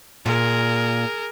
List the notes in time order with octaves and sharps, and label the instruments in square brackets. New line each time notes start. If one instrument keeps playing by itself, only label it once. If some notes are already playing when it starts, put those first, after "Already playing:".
[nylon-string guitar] A#2 [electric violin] G#4 A#4